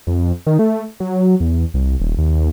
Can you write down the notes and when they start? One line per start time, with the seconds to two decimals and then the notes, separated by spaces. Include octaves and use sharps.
0.07 F2
0.47 D#3
0.59 A3
1.00 F#3
1.40 E2
1.74 C2
2.00 D#1
2.18 D#2